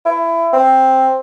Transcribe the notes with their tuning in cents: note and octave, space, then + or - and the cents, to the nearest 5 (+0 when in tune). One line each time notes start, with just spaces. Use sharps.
E4 +20
C4 +5